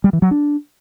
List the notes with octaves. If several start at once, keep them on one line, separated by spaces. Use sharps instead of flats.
G3
E3
F#3
D4